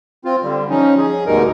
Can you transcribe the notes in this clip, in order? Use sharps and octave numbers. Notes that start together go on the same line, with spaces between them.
C4 F4
D3 G3
F3 C#4 D#4
G#4
D2 G#2 B2 G3 D#4 A#4